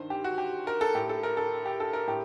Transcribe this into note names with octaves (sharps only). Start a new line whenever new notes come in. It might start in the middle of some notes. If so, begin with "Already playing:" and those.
Already playing: G2 D#3 C5
G4
F#4
G4
A#4
A4
A2 G4
A4
A#4
A4
G4
A4
A#4
A2 G4